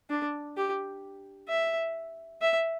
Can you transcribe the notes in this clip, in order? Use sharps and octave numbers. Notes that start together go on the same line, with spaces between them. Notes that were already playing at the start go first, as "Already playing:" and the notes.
D4
G4
E5
E5